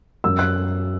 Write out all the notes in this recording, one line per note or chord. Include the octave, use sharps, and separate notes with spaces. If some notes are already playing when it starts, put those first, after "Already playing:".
F#2 E6
F#6